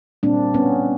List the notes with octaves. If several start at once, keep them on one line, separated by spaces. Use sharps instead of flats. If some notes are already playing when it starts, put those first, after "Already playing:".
A#2 G3 A#3 C4 D4
B3 C#4